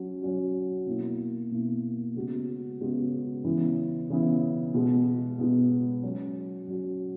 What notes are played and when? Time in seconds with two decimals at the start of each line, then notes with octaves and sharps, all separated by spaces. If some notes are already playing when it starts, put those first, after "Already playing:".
Already playing: F#3 C#4 F#4
0.21 F#3 C#4 F#4
0.86 B2 A#3 E4
1.51 B2 A#3 E4
2.15 C#3 G#3 B3 F#4
2.81 C#3 G#3 B3 F#4
3.44 C#3 E3 B3 E4
4.10 C#3 E3 B3 E4
4.74 B2 G#3 B3
5.39 B2 G#3 B3
6.03 F#3 C#4 F#4
6.67 F#3 C#4 F#4